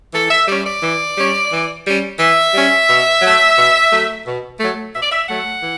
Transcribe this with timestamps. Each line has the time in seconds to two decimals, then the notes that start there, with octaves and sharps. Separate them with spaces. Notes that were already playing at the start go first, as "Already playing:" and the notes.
0.13 E3 A4
0.30 E5
0.48 G3 C#4 D5
0.64 D5
0.82 E3
1.17 G3 C#4
1.50 E3
1.85 G3 C#4
2.19 E3 E5
2.54 G3 C#4
2.89 B2
3.22 F#3 A3
3.57 B2
3.91 F#3 A3
4.26 B2
4.59 F#3 A3
4.94 B2 E5
5.02 D5
5.11 E5
5.28 F#3 A3 F#5
5.62 E3